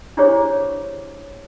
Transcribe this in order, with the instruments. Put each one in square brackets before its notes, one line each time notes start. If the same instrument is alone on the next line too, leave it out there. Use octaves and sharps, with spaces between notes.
[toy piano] D4 E4 G4 G#4 C5 C#5